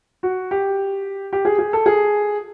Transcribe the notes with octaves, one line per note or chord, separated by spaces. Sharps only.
F#4
G4
G4
G#4
G#4
A4
G#4